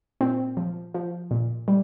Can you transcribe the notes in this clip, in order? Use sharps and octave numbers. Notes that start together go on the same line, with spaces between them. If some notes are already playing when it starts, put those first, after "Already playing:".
A#2 C4
F3
F3
A#2
G3